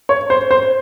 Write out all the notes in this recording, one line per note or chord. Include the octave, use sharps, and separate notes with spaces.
C#5
C5
C5